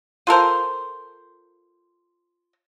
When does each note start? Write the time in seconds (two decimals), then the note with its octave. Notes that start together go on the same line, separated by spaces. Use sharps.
0.27 F4 A4 A#4 C5